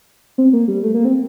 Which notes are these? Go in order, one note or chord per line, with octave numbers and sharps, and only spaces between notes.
C4
A#3
G3
A3
A#3
C4